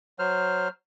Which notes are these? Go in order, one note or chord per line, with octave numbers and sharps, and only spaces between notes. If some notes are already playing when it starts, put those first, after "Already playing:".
F#3 C5 F6